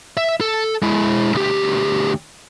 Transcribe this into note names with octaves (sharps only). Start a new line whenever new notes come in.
E5
A4
G#3 E4
D2 G4